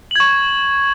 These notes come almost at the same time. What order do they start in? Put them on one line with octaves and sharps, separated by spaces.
F#7 G#6 C#6